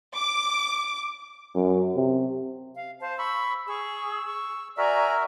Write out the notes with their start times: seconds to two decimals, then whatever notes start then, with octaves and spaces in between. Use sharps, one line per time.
0.16 D6
1.55 F#2
1.96 C3
2.76 F5
3.00 C5 F5 A5
3.19 B5 C#6 E6
3.67 G#4 C#6 E6
4.27 C#6
4.78 F#4 A#4 D5 E5 G#5 A#5